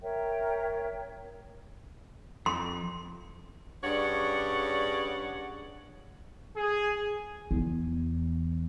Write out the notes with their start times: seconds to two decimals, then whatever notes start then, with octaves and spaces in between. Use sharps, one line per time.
0.02 A#4 C#5 E5 G5
2.46 F2 C6
3.84 G2 C#3 C#5 D5 F#5
6.57 G#4
7.51 E2